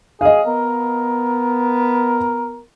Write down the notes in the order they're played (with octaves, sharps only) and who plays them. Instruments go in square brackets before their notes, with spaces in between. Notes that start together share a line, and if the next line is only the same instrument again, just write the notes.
[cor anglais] G#4 [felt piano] D#5 F5
[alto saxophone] B3 [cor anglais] A#4